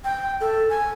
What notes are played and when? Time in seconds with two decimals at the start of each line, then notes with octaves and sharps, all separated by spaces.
0.05 G5
0.41 A4
0.70 G#5